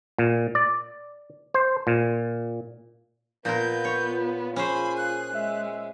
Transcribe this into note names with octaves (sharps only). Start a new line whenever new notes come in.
A#2
D5
C5
A#2
A#2 B3 F4 A#4 G6
C#5
C#4 G#4 C5 B5
F#6
G#3 E5